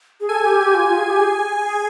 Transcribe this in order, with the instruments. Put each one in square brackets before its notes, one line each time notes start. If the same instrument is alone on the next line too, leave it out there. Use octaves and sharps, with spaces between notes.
[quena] G#4
[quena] A4 [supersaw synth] G#5
[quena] G4
G4
F4
F4
G#4
G4
G#4